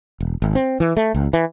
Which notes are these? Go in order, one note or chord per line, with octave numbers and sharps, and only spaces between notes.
E1
G#1
C4
E3
A3
C#2
E3